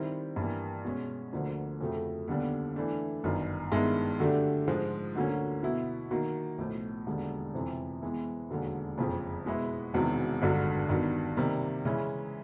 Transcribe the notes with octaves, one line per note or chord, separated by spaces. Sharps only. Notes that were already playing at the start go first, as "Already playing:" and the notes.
Already playing: D#3 G3 C4 E4
G2 E3 G3 A#3
B2 G#3 C#4
D2 D3 F3 A#3 D4
F2 C#3 F#3 A3
D#2 D3 G3 B3 D4
E3 A3 D4
G1 F#2 D#3
G2 D#3 G#3 B3 E4
D3 F#3 A3 D4 G4
G#2 F3 G#3
D2 D3 F#3 A#3 C#4
B2 F#3 B3 E4
D#3 F#3 A#3
B1 A2 F3
E1 D#2 D3 G3
F2 C3 E3
E3 G#3 B3
E1 D#2 D3 F#3
F#1 F2 C#3 F3
B2 G#3 B3 E4
E1 E2 C3 D#3 F#3
G#1 G2 D3 F#3
G2 D#3 F#3 B3
C3 D#3 G3 A#3
C#3 E3 G#3 C#4 E4